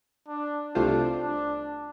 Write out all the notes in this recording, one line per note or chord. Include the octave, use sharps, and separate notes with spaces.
D4
C2 C3 A3 D4 F4 C5
D4